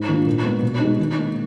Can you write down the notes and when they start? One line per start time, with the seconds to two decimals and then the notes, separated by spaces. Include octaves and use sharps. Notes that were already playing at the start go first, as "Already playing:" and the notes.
Already playing: G#2
0.09 D#3 A#3 D4 F4
0.26 A#2
0.44 G#3 B3
0.63 B2
0.81 G#3 D#4
0.99 D#3
1.18 A#3 D#4